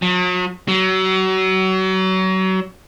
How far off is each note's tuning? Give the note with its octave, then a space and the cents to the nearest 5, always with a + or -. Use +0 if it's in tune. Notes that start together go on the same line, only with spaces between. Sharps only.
F#3 -40
F#3 +30